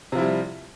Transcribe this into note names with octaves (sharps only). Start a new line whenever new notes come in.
C3 F3 G3 E4